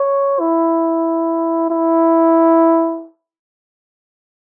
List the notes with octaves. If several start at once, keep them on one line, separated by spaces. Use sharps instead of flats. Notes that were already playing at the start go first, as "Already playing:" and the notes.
Already playing: C#5
E4
E4